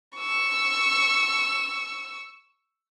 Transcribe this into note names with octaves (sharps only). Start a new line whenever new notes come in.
C#6 E6